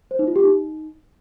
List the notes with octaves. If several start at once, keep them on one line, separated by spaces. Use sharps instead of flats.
C5
D#4
F4
G4
D#4